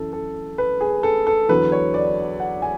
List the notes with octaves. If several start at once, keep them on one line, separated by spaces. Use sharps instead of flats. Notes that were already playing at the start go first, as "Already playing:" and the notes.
Already playing: F#2 E3 A4
A4
B4
G#4
A4
A4
E2 D3 F#3 B4
C#5
D5
F#5
G#5